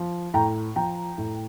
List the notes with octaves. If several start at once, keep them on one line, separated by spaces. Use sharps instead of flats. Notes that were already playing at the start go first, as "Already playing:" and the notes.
Already playing: F3
A2 G5 A#5
F3 G5 A#5
A2